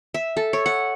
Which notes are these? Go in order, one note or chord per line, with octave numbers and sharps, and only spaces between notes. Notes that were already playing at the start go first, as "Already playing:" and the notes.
E5
A4
C#5
F#5